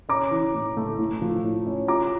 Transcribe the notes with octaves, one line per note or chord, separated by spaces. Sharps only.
C#4 A#5 D6
E3
A2
A3
A2
F3
A2
C#4
F4 A#5 D6